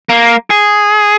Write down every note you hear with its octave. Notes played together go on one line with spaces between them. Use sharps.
A#3
G#4